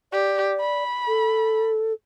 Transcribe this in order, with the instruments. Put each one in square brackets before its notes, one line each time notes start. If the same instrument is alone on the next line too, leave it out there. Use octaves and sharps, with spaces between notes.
[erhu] G4 [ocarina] D5
[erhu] B5
[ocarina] A4